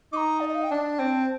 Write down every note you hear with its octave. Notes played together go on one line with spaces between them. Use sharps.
D#4 A#5 D6
D5
D#5
F5
G5
D4 A5
C4